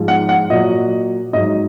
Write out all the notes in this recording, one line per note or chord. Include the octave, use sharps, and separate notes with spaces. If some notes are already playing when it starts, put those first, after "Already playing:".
Already playing: G#2 F3 G#3
F#5
F#5
A#2 F#3 D#5
G#2 F#3 D#5